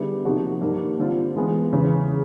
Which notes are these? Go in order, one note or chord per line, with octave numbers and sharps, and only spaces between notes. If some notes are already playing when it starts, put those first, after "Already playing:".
Already playing: D3 G3 B3 E4 G#4
C3 F3 A#3 D#4 F#4
G2 D#3 G3 A#3
D3 G3 C4 F4
E3 G#3 B3
E2 C#3 E3